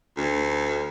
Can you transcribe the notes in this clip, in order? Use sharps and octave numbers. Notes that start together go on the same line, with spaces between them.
D2